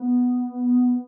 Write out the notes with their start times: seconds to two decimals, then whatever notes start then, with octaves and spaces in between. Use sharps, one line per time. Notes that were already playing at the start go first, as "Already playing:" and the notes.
Already playing: B3